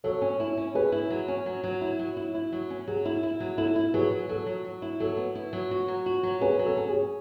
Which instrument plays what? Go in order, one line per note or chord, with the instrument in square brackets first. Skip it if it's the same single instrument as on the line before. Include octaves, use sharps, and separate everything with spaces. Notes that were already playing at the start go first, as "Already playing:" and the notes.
[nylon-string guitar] F#3 [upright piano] A4 C#5
[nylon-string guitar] C#4
E4
C#4
[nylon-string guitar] C#4 [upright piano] G#4 B4
[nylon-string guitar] E4
F#3
C#4
F#3
F#3
E4
F#3
E4
E4
F#3
C#4
[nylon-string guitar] F#3 [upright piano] G#4
[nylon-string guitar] E4
E4
F#3
[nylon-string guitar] E4 [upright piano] A4
[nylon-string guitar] E4
[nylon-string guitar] F#3 [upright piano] G#4 B4
[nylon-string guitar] F#3
[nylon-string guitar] F#3 [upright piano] A4
[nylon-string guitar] F#3
F#3
E4
[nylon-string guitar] F#3 [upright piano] A4
[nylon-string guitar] B3
E4
F#3
F#4
F#3
F#4
F#3
[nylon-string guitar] C#4 [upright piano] G#4 B4
[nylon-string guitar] F#3
[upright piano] A4
[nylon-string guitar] C#4
[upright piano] G#4
[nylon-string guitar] C#4